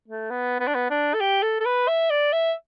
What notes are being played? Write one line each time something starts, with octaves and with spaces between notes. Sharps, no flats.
A3
B3
B3
D4
B3
D4
A4
G4
A4
A4
B4
E5
D5
E5